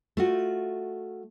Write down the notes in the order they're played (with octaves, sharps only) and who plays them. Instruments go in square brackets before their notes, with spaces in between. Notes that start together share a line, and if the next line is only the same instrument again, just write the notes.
[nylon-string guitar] A3 F4 F#4